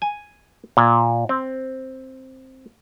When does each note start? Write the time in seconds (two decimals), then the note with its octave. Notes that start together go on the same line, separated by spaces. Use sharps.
0.02 G#5
0.77 A#2
1.29 C4